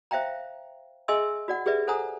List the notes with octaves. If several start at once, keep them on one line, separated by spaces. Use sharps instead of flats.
C5 E5 F5 G5 A#5
G#4 D#5 E5 G#5 C6 E6
F#4 D5 F#5
G4 G#4 B4 D5 E5
A4 C5 F#5 G#5 A#5 D#6